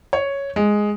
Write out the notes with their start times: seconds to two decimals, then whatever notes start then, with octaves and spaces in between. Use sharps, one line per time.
0.13 C#5
0.56 G#3